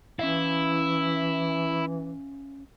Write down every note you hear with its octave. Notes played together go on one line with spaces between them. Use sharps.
E3 C#4 E4 E5 F5